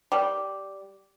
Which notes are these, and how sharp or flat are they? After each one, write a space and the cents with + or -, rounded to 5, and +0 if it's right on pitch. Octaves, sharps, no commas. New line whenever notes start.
G3 -10